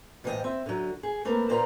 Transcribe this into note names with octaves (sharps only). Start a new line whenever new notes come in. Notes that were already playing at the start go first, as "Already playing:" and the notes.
A2 E3 F3 F4 D#5 G5
C4 E5
D3 F#3
G#4
A3 A#3 C4 A#4 B4
A#2 A#3 B4 C5 A5 A#5